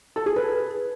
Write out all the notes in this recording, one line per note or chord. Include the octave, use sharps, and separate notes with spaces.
A4
G#4
B4